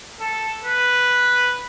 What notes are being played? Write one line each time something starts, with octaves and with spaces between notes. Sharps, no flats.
A4
B4